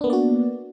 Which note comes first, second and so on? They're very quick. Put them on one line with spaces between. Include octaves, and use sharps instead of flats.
D4 B3 A#3 D5 F#4